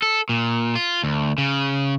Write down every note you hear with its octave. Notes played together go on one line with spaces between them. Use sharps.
A4
A#2
F4
D2
C#3